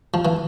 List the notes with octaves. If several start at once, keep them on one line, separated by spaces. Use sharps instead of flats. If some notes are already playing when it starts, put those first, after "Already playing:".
F3
E3